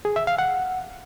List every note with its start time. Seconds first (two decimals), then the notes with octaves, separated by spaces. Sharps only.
0.05 G#4
0.16 E5
0.27 F5
0.38 F#5